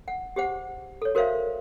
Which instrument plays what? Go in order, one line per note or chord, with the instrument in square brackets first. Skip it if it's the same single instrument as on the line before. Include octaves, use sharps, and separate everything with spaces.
[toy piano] F#5
G4 G#4 C5 F#5
A4 C#5
F#4 A#4 C5 C#5 E5 F5